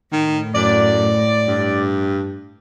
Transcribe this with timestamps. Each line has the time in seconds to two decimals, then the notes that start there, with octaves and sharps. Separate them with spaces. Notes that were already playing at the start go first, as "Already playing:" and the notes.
0.12 A2 D#3
0.55 F#2 D5
1.48 G2